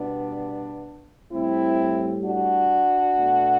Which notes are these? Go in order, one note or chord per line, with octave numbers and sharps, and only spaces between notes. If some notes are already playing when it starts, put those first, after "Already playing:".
Already playing: B2 G3 B3 D4
A2 G3 C4 E4
D4 F#4
B2 A3